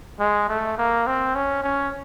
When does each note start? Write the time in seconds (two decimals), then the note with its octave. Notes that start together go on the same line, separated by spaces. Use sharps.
0.20 G#3
0.49 A3
0.78 A#3
1.07 C4
1.35 C#4
1.63 C#4